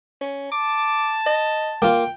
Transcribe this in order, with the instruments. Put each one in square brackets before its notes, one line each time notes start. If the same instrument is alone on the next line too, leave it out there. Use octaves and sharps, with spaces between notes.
[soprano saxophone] C#4
[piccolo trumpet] A5 [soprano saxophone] D6
[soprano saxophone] D#5
[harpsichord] A#3 F4 [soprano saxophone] G5